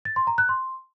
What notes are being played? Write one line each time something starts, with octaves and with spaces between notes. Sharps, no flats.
A6
C6
A#5
F#6
C6